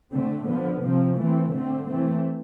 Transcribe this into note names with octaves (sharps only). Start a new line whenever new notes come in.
D3 A3 C4
D3 F3 B3
C3 F3 C4
E3 A3 C4
D3 A3 C4
E3 A3 C4